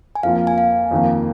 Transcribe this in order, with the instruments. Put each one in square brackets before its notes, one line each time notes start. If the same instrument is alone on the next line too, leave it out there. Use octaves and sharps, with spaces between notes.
[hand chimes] G#5
[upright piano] F2 F3 A#3 F4 [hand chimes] F5
[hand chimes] G#5
F5
[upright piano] F2 D#3 A#3